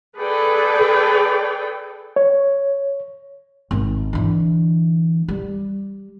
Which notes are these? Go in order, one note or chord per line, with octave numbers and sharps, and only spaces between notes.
G#4 A4 B4 D5 G5
C#5
G#1
D3 E3
G3